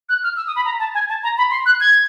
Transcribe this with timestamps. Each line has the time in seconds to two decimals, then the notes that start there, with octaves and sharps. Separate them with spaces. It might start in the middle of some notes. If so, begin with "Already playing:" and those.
0.09 F#6
0.23 F6
0.36 E6
0.47 D#6
0.56 B5
0.65 A#5
0.79 A5
0.94 G#5
1.09 A5
1.23 A#5
1.38 B5
1.51 C6
1.66 F#6
1.80 G#6